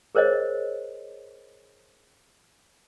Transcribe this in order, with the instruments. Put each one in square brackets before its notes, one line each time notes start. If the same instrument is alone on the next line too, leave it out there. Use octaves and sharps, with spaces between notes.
[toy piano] G#4 A#4 C5 C#5 D#5